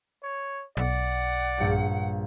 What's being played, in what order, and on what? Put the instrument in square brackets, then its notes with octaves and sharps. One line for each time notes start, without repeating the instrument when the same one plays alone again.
[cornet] C#5
[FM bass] B1 [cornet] D5 [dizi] F#5
[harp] A#1 G2 C#7